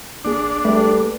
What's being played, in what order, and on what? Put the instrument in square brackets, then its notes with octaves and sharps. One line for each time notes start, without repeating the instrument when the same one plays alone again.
[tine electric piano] A1 A#3 G#4 [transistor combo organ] D4
[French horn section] G3 A4 B4 [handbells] A3